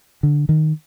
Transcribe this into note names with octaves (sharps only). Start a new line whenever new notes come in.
D3
D#3